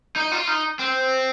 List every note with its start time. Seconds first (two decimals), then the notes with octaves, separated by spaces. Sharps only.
0.16 D#4
0.32 F4
0.47 D#4
0.79 C4